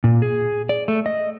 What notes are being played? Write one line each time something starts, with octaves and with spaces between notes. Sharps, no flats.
A#2
G#4
D5
A3
D#5